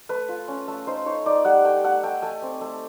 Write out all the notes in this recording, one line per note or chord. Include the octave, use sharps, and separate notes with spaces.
A3 B4
F4
C#4
A3
D#4 C5
D#4 C#5
D#4 D5
G3 F#5
A3 G5
A3 F#5
A3 G5
A3 G#5
C4
A3